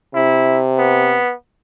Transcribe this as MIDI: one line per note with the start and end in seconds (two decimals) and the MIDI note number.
0.15 1.19 48
0.15 0.60 64
0.78 1.33 59